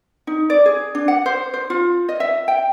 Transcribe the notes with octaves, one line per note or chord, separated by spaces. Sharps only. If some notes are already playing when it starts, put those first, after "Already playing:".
D#4
D5
G#4
D4
F#5
C5
C5
F4
D#5
E5
G5